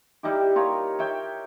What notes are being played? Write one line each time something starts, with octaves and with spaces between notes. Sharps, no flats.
G3 D#4 E4 G4
F4 A#4 C#5
C#5 E5 G5